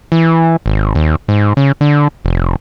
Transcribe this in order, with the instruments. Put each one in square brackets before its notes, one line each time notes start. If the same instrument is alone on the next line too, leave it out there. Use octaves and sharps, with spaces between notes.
[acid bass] E3
G#1
D#2
G#2
C#3
D3
F1